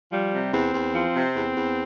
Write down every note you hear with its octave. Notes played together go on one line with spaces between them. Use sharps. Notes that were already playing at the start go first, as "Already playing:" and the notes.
F3 G3
C3
E2 C4
E2
F3
C3
E2
E2